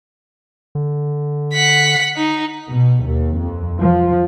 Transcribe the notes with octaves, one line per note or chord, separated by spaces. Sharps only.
D3
F#5 B6
D#4
B2
D#2
F2
F3